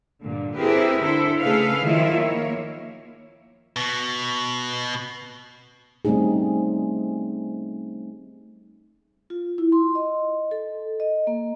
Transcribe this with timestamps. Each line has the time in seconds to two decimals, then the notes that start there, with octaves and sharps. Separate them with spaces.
0.23 G2 A#2 D3
0.56 C4 E4 G4 G#4 A#4 B4
1.01 D3 E4 A4 C5
1.39 C#3 A3 G#4 A4 B4 F5
1.83 D#3 F3 F#3 E4 F4
2.15 A#3 C#5
3.76 B2
6.05 G3 A3 C4 C#4 D#4 G#4
9.30 F4
9.58 E4
9.72 C6
9.95 D#5
10.51 A4
11.00 D#5
11.27 A#3